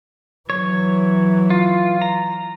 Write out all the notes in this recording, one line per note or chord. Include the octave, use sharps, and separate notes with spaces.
E3 F#3 C#5
F4
A#5